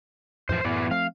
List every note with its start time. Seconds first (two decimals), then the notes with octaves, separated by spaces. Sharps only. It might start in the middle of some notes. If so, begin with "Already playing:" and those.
0.49 F2 A2 E3 F3 C5
0.64 F#2 A2 E3 B3 D5
0.91 F3 A3 C4 F5